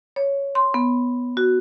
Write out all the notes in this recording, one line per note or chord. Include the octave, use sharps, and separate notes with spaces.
C#5
C6
B3
F#4